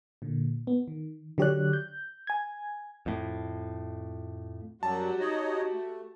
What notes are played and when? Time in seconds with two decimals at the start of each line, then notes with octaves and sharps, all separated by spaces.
0.22 A#2 D3
0.67 B3
0.88 D#3
1.38 D3 F#3 G4 C#5 D5 F#6
1.73 G6
2.27 G#5 G#6
3.06 F2 A2
4.83 F#2 F#3 G3 F#4 G4 A5
5.20 D#4 C#5 D#5
5.73 A3